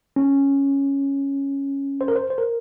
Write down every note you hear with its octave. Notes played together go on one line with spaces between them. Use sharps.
C#4
C5
A#4
C5
C5
A#4